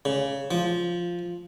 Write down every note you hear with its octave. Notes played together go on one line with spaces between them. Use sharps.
C#3
F3